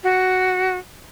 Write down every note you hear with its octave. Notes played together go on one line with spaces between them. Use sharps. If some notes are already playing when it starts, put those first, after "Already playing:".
F#4